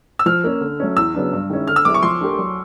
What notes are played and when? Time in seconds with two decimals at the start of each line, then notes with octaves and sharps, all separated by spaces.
0.19 E6
0.26 F3 F6
0.44 A#3 C#4
0.61 D3
0.80 F#3 A3 C#4
0.96 E2 E6
1.15 C#3 F#3 B3 D4
1.33 G2
1.50 D#3 G#3 C#4 E4
1.67 D3 F6
1.76 E6
1.85 F#3 B3 E4 G#4 D6
1.94 C#6
2.03 F3 C6
2.20 A3 D4 G4 A#4
2.39 F#3